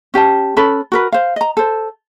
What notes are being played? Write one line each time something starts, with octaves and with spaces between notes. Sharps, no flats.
C#4 G4 G5 A5
C#4 A4 B4 B5
F#4 A#4 B4
C5 F5
D#5 A#5
A4 C5